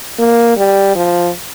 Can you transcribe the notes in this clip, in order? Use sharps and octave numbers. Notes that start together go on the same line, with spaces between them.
A#3
G3
F3